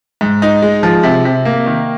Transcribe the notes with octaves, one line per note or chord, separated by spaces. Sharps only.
G#2
D#4
G#3
F3
C3
C3
A#3
D#3